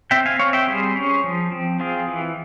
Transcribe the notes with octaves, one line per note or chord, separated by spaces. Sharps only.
C4 E5 G5
F5 G#5
C4 C#5 F5
E5 G5
G3 G#4 C5
C#4
F3
C4
C4 F4 G#4
E3